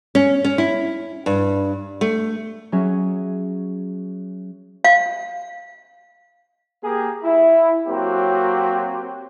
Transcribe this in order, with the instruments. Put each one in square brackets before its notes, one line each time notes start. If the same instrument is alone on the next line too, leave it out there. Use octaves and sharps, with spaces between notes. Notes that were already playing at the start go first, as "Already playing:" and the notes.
[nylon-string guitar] C#4
C#4
E4
G2
A3
[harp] F#3 C#4 G#4 E5
[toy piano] F5
[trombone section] A#3 G4 G#4
E4
F#3 A#3 C4 F#4 G4